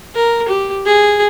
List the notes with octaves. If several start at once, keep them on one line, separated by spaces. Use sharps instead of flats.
A#4
G4
G#4